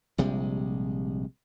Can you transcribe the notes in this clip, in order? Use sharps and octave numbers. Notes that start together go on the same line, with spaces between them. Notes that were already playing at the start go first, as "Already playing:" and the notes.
A#1 C3 G3 G#3